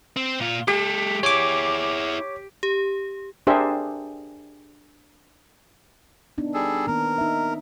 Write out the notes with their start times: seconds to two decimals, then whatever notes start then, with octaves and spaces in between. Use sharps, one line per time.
0.16 C4
0.40 A#2 F4
0.68 G#3 G4 A4
1.23 E4 G#4 C#5 D6
2.63 G4
3.47 D4 G4 G#4 A#4 C5 E5
6.38 B3 D4 D#4
6.54 G3 G#4 A4
6.87 D#3 A#3 B3 A#4
7.18 D#4 E5